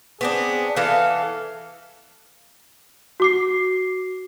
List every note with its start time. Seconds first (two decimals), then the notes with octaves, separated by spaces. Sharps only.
0.21 B3 C4 D4 G#4
0.76 E3 B3 A4 F5
3.20 F#4 D6 C7